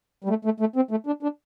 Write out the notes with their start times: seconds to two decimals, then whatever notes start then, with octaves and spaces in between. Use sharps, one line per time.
0.24 G3
0.29 A3
0.45 A3
0.60 A3
0.76 C4
0.91 A3
1.06 D4
1.23 D4